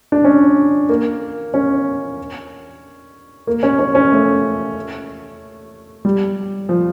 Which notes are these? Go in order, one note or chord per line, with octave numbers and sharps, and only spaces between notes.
D4
C#4
A#3
C#4
A#3
C#4
C#4
C#4
A3
G3
F3